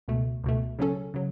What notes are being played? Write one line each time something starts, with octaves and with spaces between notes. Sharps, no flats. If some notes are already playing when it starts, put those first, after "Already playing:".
C#2 B2 A3
C#2 B2 A3
C#3 F#3 C#4 A4
C#3 F#3